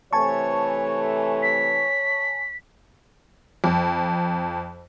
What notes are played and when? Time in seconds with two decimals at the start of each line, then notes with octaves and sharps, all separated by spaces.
0.13 C3 E3 A3 C#5 G#5 A5 C#6
1.42 B6
3.64 F2